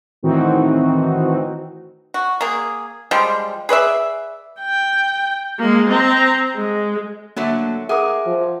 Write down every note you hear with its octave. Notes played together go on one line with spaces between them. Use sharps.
A2 D#3 E3 C4 D#4 F#4
F#4
A#3 G#4
F3 G3 G#3
G#4 B4 D5 E5
G5
G#3 A#3
C4 A#5
G#3
D3 F#3 A3 A#3
G#4 A#4 E5 F#5 D6
F3